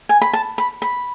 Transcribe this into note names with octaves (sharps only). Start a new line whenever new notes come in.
G#5
B5
A5
B5
B5